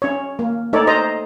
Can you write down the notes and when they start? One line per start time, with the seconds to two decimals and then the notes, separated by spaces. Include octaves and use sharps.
0.02 C#4 C#5
0.39 A#3
0.73 A3 D#4 A4 A#4 C#5 D5
0.87 C5 D#5 A#5